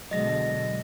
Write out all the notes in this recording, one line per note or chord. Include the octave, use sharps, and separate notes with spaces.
B2 D3 F#3 G#3 D#5 A#6